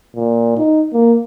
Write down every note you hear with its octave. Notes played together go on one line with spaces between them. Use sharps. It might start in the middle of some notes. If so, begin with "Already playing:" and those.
A#2
D#4
A#3